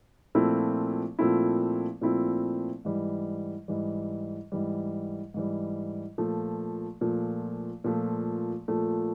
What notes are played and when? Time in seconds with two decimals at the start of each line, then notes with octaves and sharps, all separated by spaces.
0.35 A#2 F3 A3 C4 E4
1.19 A#2 F3 A3 C4 E4
2.01 A#2 F3 A3 C4 E4
2.85 G#2 E3 G3
3.68 G#2 E3 G3
4.52 G#2 E3 G3
5.34 G#2 E3 G3
6.18 A#2 F3 A3
7.01 A#2 F3 A3
7.84 A#2 F3 A3
8.68 A#2 F3 A3